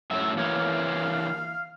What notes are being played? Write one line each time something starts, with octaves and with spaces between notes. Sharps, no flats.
F#2 A2 E5
E3 A#3 C#5 F5